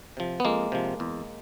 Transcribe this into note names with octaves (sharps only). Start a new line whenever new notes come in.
C3 F3
B3
F2 G#3 A#3
C3 F3
E2